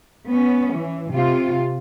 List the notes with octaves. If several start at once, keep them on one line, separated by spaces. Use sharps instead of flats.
B3 C#4
E3
C3 F4